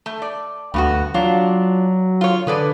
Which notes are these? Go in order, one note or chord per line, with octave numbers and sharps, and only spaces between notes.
A3
D5
D2 G2 B3 F#4
F#3 D4 F4
F4 C#5
D3 G#4 B4 D5